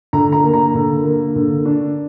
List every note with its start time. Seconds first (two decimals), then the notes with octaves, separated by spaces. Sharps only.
0.13 D3 A#5
0.32 A#5
0.43 A#3
0.54 A#5
0.74 D3
1.04 A#3
1.36 D3
1.65 D4